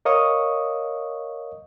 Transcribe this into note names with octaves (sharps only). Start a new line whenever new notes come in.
A#4 C#5 D#5 F5 C#6 D#6